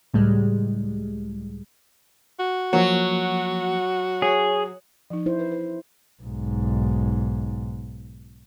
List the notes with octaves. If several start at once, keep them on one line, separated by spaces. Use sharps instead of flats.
C#2 A2 G3 G#3
F#4
F3 F#3 A#3
G#4 C#5
F3 D#4
E4 C5
B4
B4
B1 G#2